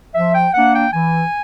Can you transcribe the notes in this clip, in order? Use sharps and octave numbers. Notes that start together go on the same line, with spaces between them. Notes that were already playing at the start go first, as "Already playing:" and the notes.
F3 E5
G5
A#3 D4 F#5
G5
E3 G#5